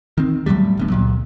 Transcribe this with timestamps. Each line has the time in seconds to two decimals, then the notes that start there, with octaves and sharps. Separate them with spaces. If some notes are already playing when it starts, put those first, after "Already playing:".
0.18 D#3 C4
0.46 A2 C#3 F#3 G3
0.77 D1 D2 B3
0.90 C#2 A#2 F#3